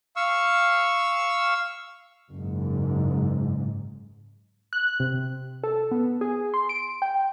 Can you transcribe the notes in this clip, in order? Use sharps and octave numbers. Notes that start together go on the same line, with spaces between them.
F5 C#6 E6
F#1 G#2
F#6
C3
A4
B3
G#4
C6
D7
G5